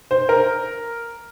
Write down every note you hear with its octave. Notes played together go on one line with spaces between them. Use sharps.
C5
A#4